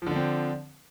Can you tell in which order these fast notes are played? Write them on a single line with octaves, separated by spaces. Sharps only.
F3 D3 D4 C4